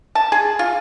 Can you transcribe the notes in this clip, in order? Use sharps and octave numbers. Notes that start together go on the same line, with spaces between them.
A5
G#4
F4